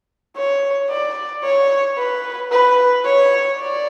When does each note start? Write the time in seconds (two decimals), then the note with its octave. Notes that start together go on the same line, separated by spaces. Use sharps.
0.37 C#5
0.90 D5
1.44 C#5
1.98 B4
2.52 B4
3.05 C#5
3.59 D5